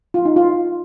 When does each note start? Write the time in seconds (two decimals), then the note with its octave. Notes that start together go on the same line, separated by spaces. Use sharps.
0.14 F4
0.25 D#4
0.36 F4